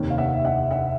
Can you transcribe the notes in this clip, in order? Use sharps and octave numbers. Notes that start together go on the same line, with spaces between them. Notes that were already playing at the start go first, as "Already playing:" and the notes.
Already playing: F1 D#2 D#3
F5
E5 F#5
E5 F#5
E5 F#5